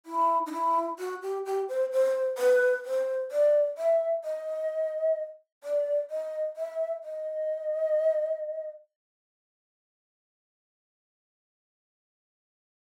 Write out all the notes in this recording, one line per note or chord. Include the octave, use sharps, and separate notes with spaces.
E4
D#4
E4
F#4
G4
G4
C5
C5
B4
C5
D5
E5
D#5
D5
D#5
E5
D#5